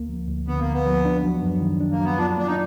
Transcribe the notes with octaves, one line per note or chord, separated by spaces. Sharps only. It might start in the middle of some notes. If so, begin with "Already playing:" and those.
Already playing: D2 A#3
F3
D2
D3 B3
A#3
D2
B3
F3
D4
F#3
F#2
D#3
D4
A#3
F#3
B3
D4 F4
A#3 D4
D#4